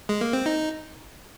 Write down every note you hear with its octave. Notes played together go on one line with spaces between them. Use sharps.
G#3
A#3
C4
D#4